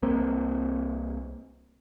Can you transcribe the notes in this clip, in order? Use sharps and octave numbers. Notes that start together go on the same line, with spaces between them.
C2 A#3 C4